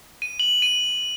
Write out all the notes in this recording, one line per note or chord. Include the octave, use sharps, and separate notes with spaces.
D#7
F#7
D#7